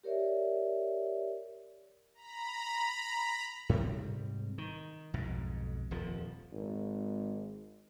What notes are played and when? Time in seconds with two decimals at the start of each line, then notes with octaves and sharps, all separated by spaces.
0.04 G4 A#4 C#5 D5 E5
2.14 A#5 B5
3.69 G#2 C3 G3 C4
4.58 D#3
5.14 B1 F2 G#2
5.91 D#1 F2 F3
6.53 G#1